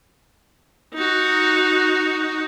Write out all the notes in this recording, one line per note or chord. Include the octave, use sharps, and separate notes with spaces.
D#4 F#4